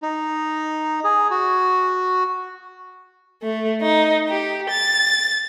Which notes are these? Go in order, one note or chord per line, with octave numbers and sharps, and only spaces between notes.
D#4
G#4
F#4
A3
D#4
G4
A6